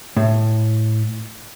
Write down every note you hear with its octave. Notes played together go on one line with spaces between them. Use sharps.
A2